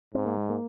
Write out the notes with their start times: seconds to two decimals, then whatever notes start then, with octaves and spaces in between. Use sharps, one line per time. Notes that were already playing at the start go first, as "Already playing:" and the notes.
0.14 G#2 C4
0.26 A#3
0.37 G#3
0.50 A#3